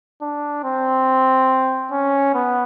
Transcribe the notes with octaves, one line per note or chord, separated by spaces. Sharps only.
D4
C4
C#4
B3